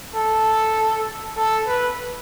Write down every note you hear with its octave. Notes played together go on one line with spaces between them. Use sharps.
A4
A4
B4